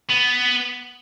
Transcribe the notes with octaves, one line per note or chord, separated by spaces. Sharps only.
B3